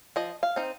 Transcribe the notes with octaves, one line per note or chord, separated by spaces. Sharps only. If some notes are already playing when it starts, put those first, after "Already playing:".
F3 D#5
F5
C4 D#4